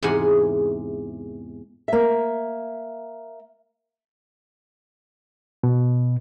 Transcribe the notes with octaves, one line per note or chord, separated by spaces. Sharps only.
E2 G#2 C3 F#5 G#5
A#3 E5
B2